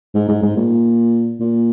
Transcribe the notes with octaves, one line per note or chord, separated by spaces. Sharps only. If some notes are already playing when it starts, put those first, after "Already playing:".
G#2
G#2
G#2
A#2
A#2